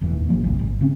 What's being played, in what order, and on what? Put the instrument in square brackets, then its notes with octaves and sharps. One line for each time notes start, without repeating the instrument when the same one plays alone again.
[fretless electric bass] E1 E2 A2 E3
D#2
G#1 A2 F3 A#3
D1 G1 C2
G#1
C#3 C4 C#4